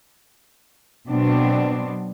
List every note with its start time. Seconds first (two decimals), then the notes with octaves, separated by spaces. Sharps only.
1.08 B2 F#3 B3 C4 D4